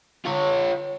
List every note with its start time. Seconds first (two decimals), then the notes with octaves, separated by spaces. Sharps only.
0.25 F4 C#5